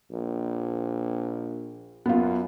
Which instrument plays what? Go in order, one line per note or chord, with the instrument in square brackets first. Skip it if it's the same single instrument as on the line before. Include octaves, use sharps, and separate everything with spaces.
[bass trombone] A#1
[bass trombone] F#2 [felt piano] B3 F4